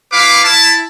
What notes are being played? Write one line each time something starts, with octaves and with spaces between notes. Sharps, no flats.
E4 B4 F5 D6
E4 A5